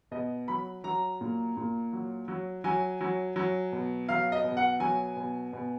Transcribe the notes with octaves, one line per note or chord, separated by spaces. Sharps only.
B2 D#5
F#3 B5
F#3 A#5
A#2
A#2
F#3
F#3
F#3 G#5
F#3
F#3
B2
F#3 F5
D#5
B2
F#5
F#3 G#5
B2
B2